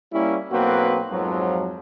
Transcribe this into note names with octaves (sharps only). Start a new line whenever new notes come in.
G3 A#3 C#4 E4
B1 A#3 C4 F#4 B4
F2 G#2 F3 F#3